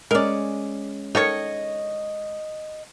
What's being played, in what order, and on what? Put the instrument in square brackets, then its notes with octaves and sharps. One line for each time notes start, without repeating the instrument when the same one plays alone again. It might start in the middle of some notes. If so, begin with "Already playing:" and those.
[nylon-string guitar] G#3 C#4 [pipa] A#4 D5
[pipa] D#3 A4 C#5 [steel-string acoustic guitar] D#5